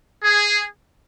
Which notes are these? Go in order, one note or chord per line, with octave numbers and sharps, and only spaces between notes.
G#4